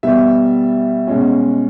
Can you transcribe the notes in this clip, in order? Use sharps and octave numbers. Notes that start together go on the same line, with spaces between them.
B2 G3 B3 E5
B2 G#3 C#4